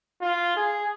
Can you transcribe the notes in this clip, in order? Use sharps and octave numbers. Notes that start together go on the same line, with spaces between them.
F4
G#4